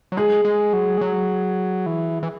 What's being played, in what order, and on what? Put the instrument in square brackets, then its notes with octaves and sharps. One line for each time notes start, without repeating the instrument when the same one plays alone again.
[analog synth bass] F#3
[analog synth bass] G#3 [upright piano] G#4
[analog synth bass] G#3
F#3
G#3
F#3
E3
E3